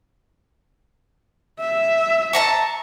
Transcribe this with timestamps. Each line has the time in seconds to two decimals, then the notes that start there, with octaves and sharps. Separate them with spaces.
1.61 E5
2.33 A5 A#5 C#6